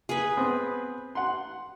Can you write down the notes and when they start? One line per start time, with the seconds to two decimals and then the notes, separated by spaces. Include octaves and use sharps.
0.09 G#4 B4
0.37 B3 C4 D#6
1.15 F#5 C6